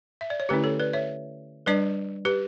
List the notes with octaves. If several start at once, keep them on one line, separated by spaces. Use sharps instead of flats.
E5
D5
C#5
D3 A3 C#4 E4 G4 B4
A4 C#5
B4 D5
C#5 E5
G3 D4 B4 D5
G4 B4